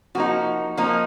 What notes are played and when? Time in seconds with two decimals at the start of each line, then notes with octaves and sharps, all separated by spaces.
0.15 F3 A#3 D#4 F#4
0.77 F3 A#3 D#4